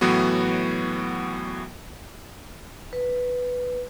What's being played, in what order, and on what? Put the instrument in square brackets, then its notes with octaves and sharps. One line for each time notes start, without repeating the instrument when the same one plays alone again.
[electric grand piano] A2 E3 F#3 B3 F#4
[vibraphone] B4